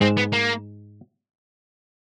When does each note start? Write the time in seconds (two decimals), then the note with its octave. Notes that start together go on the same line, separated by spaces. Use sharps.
0.01 G#2 G#3 C4
0.17 B3
0.33 A#3